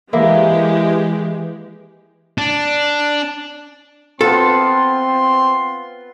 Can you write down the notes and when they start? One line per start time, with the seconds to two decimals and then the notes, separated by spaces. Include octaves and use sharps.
0.13 E3 G#3 A#3 E4 G4
2.38 D4
4.21 B3 C4 F4 A4 C6